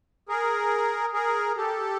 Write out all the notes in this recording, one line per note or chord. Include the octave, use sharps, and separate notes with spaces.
G#4 A#4
G#4 A#4
G4 A4